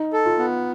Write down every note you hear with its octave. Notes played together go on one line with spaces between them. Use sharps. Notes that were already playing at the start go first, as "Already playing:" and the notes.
Already playing: D#4
A4
F4
B3